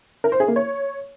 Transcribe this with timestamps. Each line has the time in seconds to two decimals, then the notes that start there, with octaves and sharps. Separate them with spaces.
0.24 A#4
0.32 C5
0.40 G#4
0.48 A#3
0.56 C#5